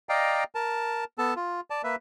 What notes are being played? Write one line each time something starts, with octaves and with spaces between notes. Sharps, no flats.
D5 D#5 F5 G5 A#5
A#4 A5
B3 A4 A5
F4
D5 A5
A#3 B4 E5